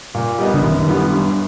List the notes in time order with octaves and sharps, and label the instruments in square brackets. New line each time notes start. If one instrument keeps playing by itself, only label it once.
[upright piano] A#2
G3 B3 D#4
[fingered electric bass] D3
[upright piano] F#2 [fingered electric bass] D#3
[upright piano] D3 G3 B3 E4
G2